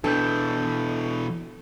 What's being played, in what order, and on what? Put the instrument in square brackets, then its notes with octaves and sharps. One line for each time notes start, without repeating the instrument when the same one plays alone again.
[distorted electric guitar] B2 E3 [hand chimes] D4 G6 [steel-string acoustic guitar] A4